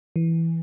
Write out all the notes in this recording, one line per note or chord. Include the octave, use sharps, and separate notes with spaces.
E3